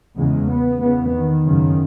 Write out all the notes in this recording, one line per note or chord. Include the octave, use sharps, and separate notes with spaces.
E2 C#3 G#3
B3
E2 C#3 B3
D#3
F#2 C#3